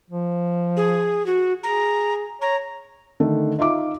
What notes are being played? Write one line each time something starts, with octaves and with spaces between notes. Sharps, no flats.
F3
G#4
F#4
G#4 A#5
C#5 A#5
D3 D#3 A3
D#4 F4 E5 D6